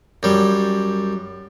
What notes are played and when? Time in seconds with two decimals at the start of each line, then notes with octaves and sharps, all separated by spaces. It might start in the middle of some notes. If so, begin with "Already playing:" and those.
0.23 F#2 G3